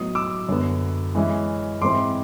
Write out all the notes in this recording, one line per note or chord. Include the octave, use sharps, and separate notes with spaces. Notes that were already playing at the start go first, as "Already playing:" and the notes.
Already playing: A2 F#3 B3 D#4 D#6
D6 E6
F#2 D3 F#3 B3
E3 G#3 C#4 E4
G#2 E3 G#3 C4 E4 C6 D6